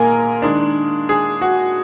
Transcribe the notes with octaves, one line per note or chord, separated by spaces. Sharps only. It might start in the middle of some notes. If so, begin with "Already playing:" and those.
Already playing: A#2 G#3 A#3 A#4 G#5
D#3 G#3 D4
G#4
F#4